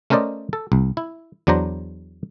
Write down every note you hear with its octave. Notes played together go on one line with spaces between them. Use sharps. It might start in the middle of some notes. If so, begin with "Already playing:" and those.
A3 C#4 A#4 C5 D5 D#5
A4
C2
E4
E2 F#3 D4 C5 A#5